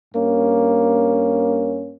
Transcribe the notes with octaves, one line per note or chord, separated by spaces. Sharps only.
G2 A#3 C#4